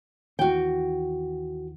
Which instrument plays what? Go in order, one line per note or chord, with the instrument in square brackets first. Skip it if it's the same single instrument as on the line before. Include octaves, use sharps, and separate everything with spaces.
[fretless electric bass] D#2 E3 [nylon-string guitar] F#4 G5